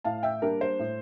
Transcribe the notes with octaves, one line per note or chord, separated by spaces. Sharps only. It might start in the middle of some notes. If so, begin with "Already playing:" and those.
A2 F5 A5
E5 G5
G3 A#3 D4 A#4
C5
A2